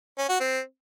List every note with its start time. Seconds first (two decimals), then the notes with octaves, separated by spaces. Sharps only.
0.18 C#4
0.29 F#4
0.40 C4